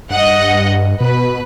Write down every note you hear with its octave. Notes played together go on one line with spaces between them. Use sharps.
G2 D#5 F#5
B2 B4